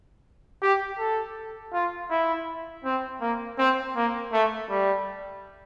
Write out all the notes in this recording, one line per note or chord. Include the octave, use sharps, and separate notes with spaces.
G4
A4
F4
E4
C4
A#3
C4
A#3
A3
G3